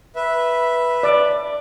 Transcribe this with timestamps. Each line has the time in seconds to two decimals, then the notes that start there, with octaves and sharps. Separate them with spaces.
0.16 B4 E5
1.03 D5